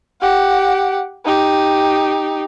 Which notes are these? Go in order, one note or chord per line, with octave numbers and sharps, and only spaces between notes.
G4 F#5
D#4 G4